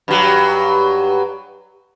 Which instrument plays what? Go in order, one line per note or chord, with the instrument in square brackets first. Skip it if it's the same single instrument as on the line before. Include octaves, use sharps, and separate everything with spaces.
[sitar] G2 F#3